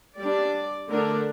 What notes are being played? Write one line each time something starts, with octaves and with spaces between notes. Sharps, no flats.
G3 D4 D5
D3 A3 D4 A#4